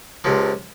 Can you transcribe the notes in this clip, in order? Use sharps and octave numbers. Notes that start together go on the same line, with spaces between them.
C#2 C3 F3 A#3